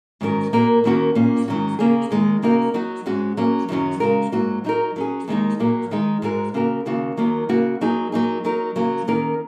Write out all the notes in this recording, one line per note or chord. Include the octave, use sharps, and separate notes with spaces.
G#2 D#3 F#3 C#4 A#4
A#2 A#3 F#4 A#4
D#2 D#3 A#3 C#4 F#4
A#2 A#3 C#4
G#2 D#3 F#3 C#4 F#4
C#3 A#3 C#4 G#4
D#2 D#3 G#3
C#3 A#3 D#4 F#4 A#4
F#3 D#4 F#4
G#2 G#3 C#4 F#4
F#3 A#3 C#4
F#2 D#3 F#3 C#4
C#3 G#3 F#4 A#4
G#2 F#3 A#3 F#4
F#3 D#4 A#4
F#3 C#4 G#4
D#2 D#3 G#3 D#4
A#2 F#3 A#3
D#3 G#3 D#4
G#2 G#3 F#4 A#4
C#3 A#3 F#4 A#4
D#2 C#3 A#3 F#4
D#2 D#3 F#3 A#3
C#3 A#3 F#4
F#3 A#3 D#4 G#4
F#3 A#3 D#4 G#4
F#3 D#4 A#4
C#3 F#3 A#3
D#3 A#3 C#4 A#4